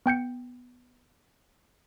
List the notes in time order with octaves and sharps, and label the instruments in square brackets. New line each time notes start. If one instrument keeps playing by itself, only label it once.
[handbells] B3 G5 G6 C#7